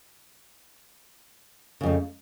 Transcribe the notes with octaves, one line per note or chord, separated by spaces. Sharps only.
F2 C#3 A3